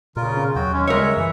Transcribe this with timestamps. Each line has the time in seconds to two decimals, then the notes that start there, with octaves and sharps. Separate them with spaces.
0.16 A#2 C#3 F4 A#4
0.34 B2 C#4
0.56 D#2 F#3 F#4 G5
0.73 G#3 C#4
0.87 C#3 G3 G#3 A#4 C#5 E5
1.17 F#2 E3